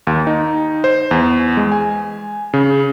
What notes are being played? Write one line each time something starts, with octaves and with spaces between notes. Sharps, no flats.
D#2
D#4
C5
E2
G#3
G#5
C#3